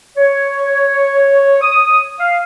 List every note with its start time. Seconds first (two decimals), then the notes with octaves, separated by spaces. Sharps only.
0.17 C#5
1.61 D#6
2.18 F5